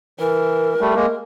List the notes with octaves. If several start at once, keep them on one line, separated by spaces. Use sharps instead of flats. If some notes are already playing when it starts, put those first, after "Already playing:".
E3 A#4
G3 A3
G#3 A#3